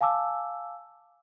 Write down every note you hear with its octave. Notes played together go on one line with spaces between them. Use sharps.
F5 G#5 A5 D6 E6